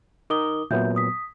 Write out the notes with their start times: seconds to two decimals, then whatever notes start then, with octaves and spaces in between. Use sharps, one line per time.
0.30 D#4 A#4 D6 D#6 G7
0.71 A#2 F#3 B3 E5 G6
0.96 D#6 B6